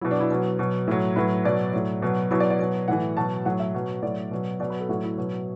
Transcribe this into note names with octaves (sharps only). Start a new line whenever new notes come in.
B2 F#3 E4
D4
E4
B2 F#3
B2 F#3
A2 F#3
A2 F#3 B4
B2 F#3 D5
A2 F#3
B2 F#3
B2 F#3 E4
D5
D5
B2 F#3
A2 E3 F#5
B2 F#3 A5
A2 F#3 F#5
E5
B2 F#3
A2 F#3 D5
B2 F#3
B2 F#3 D5
B4
A4
A2 F#3 F#4
E4
B2 F#3